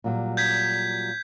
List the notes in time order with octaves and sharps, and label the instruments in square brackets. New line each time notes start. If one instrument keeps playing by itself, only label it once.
[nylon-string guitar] A#2 F#3 G3
[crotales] G6 G#6 B6